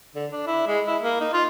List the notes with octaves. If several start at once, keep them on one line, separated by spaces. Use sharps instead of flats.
D3
D4
E4
G#3
E4
A#3
D#4
F4